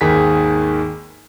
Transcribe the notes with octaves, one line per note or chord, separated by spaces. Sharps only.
G#1 D#2 D#3 G#4 B6